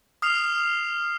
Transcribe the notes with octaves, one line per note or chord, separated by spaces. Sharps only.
D#6 F6 C7 F7